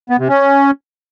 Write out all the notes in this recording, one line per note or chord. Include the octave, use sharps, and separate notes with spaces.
B3
C3
C#4